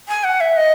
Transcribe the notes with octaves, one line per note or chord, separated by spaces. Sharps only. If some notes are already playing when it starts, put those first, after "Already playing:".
G#5
F#5
E5
D#5